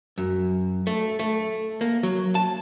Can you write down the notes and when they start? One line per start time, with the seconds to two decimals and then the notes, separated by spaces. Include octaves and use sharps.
0.18 F#2
0.87 A3
1.19 A3
1.81 A#3
2.03 F#3
2.35 A5